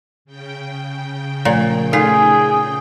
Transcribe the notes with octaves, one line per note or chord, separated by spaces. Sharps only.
C#3 G5
A#2 F3 A3 A#5
A3 D#4 F4 G#4 A4